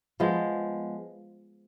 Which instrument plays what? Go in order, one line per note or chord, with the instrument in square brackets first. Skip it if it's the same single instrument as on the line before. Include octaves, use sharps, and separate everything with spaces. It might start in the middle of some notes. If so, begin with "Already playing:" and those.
[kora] F3 G#3 B3